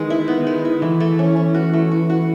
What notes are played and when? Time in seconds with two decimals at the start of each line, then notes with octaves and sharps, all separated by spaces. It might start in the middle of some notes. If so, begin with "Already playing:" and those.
Already playing: D#3 G#3 B3
0.10 E4
0.28 B3
0.47 G#3
0.65 E4
0.82 E3 A3
1.00 A3
1.19 C#4
1.36 C#4
1.55 F#4
1.73 A3
1.91 F#4
2.10 F#4